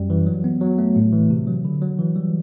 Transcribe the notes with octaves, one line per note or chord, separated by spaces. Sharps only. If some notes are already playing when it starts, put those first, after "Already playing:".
Already playing: F#2 G3
E3
F#3
B3
F#3
A3
A2
E3
C3
F#3
D3
F#3
E3
G3